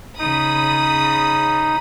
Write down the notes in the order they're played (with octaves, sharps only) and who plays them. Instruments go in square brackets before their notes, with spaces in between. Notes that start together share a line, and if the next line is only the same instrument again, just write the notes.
[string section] C#3 B5 D#6 [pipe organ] D#4